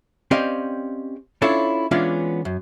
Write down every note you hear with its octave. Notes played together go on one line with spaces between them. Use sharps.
C4 C#4 G4 D5 D#5 F5
C#4 D4 E4 F4 A4 C#5
E3 G#3 B3 C#4 D4 F4
F#2